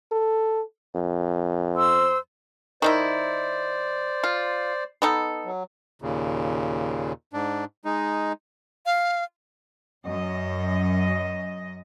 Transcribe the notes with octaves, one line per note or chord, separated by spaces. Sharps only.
A4
F2
C5 C6 E6
D#3 D#4 E4 C5 D5
F4
B3 D#4 A4
F#3
D#2 A#2 C#3
G#2 D4
G#3 D#4
F5
F#2 D#5